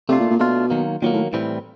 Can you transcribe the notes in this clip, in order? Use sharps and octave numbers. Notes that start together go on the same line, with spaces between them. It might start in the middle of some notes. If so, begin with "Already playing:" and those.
C3 A3 D4 F4
A#2
A#2
B2 A3 D4 F4
D#3 F#3 A#3
A#2 D#3 F#3 A#3
A2
A2 E3 G3 C4